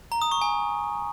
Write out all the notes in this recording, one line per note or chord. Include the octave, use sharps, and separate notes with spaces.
A#5
D#6
C#6
G#5